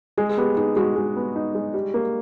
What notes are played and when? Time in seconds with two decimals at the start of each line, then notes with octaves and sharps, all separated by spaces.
0.18 G#3 G#4
0.29 G#4
0.37 B3 G4
0.57 D#4 G#4
0.76 G#3 F#4
0.96 G#3
1.16 B3
1.36 D#4
1.55 G#3
1.74 G3
1.94 A#3